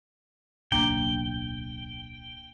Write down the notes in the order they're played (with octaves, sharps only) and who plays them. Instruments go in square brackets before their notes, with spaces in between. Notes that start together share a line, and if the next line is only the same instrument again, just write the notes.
[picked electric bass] D1 B1 [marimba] A#3 D4 [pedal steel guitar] G5